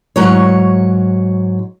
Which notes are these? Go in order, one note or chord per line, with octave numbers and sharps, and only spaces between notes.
G#2 F#3 C#5